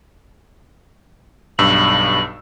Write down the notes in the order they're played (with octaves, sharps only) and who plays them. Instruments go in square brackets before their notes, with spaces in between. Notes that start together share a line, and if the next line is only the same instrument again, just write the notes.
[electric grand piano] B1 G2 E6 [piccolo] F#7